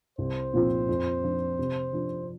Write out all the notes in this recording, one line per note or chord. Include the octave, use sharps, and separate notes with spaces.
C2 C5
A#2 F3 C4 F4
F2
F3 D4 F4
C3
F3 D4